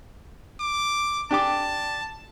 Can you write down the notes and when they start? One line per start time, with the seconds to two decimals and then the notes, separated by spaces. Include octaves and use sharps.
0.60 D6
1.31 D4 G4 A5 D6